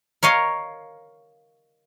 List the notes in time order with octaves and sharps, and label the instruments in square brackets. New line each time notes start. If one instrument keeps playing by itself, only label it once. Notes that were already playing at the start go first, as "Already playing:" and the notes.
[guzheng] A#4 C#5 D#5 F5